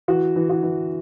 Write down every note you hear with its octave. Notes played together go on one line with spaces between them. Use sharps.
E3 F#4
E3
F#4
E3